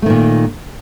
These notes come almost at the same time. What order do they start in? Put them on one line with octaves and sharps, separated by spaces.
A3 D#3 A#2